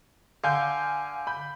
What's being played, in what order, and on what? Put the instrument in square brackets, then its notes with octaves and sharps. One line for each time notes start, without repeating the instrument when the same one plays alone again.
[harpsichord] D3 [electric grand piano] F5 G#5 G6
[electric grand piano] B5 G6